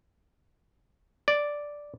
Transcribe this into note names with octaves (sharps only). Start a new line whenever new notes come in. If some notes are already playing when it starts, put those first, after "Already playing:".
D5